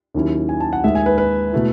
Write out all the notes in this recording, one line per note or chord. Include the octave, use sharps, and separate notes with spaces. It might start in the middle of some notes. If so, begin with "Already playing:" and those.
D#2 D#3 F#3 C#4 E4
G#5
A5
F#5
D#2 D#3 G#3 E5
G#5
B4
B4
B2 A3 E4